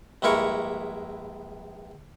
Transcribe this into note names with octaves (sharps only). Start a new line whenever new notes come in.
A#1 G2 G#3 E4 A#4 C#6